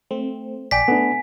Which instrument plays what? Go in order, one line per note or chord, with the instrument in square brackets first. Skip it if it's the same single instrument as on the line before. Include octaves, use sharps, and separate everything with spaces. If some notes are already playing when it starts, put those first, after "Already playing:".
[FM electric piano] A3 C4
[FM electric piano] A#1 D5 G5 [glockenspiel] G#5 B6
[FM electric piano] A3 [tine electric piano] B3 D4